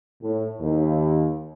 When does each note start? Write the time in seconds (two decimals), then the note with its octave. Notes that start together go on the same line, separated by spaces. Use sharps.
0.22 A2
0.61 D#2